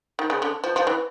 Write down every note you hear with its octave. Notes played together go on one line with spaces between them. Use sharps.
D#3
C#3
D3
F3
F3
E3